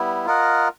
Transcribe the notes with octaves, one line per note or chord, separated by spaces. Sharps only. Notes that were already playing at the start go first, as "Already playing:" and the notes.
Already playing: G3 B3 E4
F4 A#4 D#5 F#5